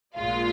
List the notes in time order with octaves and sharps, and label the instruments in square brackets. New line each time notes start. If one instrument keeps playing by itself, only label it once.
[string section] A#1 A#2 G#3 F4 F5